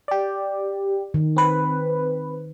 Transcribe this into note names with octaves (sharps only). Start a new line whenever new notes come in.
G4 D5
D#3
C4 B4